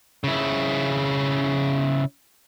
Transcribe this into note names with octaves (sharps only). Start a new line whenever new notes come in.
C#3 E4